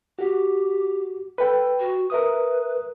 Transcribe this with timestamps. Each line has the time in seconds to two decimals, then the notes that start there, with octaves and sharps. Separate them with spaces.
0.19 F#4 G4
1.38 A4 B4 G5
1.80 F#4
2.10 A#4 B4 E5 D#6